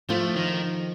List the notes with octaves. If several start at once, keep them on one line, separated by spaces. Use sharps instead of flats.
F3 A3 F4
D#3